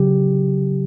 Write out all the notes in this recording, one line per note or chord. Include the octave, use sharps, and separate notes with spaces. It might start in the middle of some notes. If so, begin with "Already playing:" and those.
Already playing: C#3 F#3 G4